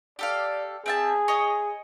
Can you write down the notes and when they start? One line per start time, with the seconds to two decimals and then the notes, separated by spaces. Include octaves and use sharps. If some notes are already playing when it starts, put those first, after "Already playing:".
0.19 G4 A4 D5 F5
0.86 C4 G#4 E5 A5
1.28 C#5 D#5